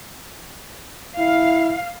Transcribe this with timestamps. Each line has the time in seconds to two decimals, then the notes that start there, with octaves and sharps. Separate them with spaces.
1.18 E4 F5